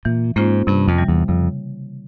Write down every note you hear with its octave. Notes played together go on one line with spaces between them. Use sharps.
A#2 E3
G#2 A#3 C#4 F4 C5
G2 C3
F2
E3 G3
E2
F2 C#3